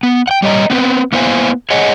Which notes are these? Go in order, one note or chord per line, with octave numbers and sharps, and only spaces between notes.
B3
F#5 G5
G3 C#5 D#5 A#5
B3 C4 G#4 B4
A#3 B3 E4 C5 F5 G#5
G#4 C#5 D#5 F#5 G#5